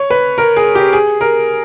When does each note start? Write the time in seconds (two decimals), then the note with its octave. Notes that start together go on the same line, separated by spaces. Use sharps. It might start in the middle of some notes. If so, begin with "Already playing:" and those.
Already playing: C#5
0.10 B4
0.38 A#4
0.56 G#4
0.75 G4
0.93 G#4
1.21 A#4